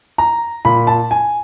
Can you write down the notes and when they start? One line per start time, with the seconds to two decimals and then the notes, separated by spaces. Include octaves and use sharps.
0.18 A#5
0.65 A#2 B5
0.87 A5
1.11 G#5